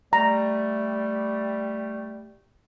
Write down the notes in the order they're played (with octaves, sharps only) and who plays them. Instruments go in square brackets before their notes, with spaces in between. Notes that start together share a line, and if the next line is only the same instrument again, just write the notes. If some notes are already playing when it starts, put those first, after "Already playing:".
[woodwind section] G3 A3 [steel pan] A#5